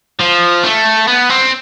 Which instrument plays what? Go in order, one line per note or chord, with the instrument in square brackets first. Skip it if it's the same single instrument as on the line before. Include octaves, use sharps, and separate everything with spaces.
[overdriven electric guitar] F3
A3
B3
C4